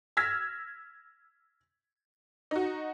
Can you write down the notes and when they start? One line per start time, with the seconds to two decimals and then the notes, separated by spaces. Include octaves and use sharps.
0.17 E6 F6 G#6 A#6 B6
2.51 D#4 F#4